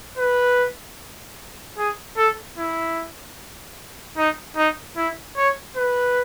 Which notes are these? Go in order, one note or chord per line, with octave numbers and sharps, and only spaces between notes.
B4
G#4
A4
E4
D#4
D#4
E4
C#5
B4